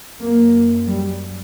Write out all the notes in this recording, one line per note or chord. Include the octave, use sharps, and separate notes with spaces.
F#2 A#3
G3